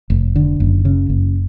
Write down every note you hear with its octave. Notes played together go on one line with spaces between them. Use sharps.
F1
D3
F#1
C#3
F#1